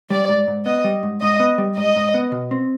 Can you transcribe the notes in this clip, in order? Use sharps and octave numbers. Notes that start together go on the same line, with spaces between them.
G3 D5
G#2
G#2
B3 D#5
G3
G#2
G#2 D#5
B3
G3
G#2 D#5
G#2
B3
B2
C4